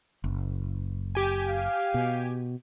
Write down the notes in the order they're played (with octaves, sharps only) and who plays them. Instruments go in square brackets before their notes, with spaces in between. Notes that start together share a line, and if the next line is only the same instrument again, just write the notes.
[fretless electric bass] F#1
[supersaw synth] G4 G#5
[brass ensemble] F5
[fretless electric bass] B2